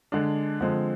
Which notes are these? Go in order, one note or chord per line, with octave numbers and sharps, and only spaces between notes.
D3 G#3 D4
D3 F3 G#3 C4